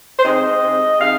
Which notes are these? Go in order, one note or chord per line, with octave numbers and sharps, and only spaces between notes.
C5
C3 G#3 D#4 D#5
C3 G#3 D#4
C3 G#3 D#4 F5